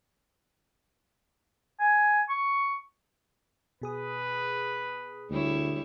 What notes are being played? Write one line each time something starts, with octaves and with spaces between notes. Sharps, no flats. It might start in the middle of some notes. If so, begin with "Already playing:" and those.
G#5
C#6
B2 G#4 B4 D#6
D2 G3 E4 C#5